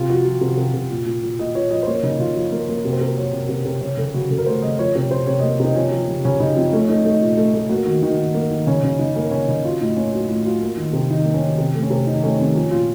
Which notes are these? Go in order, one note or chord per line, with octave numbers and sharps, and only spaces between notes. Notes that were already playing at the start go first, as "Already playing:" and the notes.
Already playing: C3 F4
F3 F#4
F3
C3
C3
C3
A#2
A#2
A#2
A#2 D#5
A#2 C#5
F3 D#5
C5
A#3 C#5
C#3 D#4
C#3 F4
F3
A#3
A#3
C3 F#4
C5
C3 A#4
F#3 C#5
C3
C3
C3
C#3 C#5
C#3 A4
C#3 F#4
C#3 A4
A#4
A3 C5
C#3 D#5
F3 C#5
C3 C#5
C3 C5
C3 C#5
A#3 D#5
C3 D#4
F3 C#4
F3
C#3
C#3 C#4
C#3 D#4
F3 C4
A3 C#4
A3 D#4
A3 D#4
A#2
A3
A3
A#3 F#4
D#3 F#4
D#3 D#4
D#3
A#3
D#3
C#3 C#4
C#3 C#4
C#3 D#4
A#3 C#4
C#3 C#4
C#3 D#4
F#3 F4
A2 D#4
A#3 C#4
F#3 D#4
A2 F4
F#3 F4
A#3
D#3
C3
D#3 D#4
A#3
C#4
D#3
C3 C4
A3
C#4
C3
D#3 D#4
A3 C#4
D#3 C4
F3 C#4
A#2 F4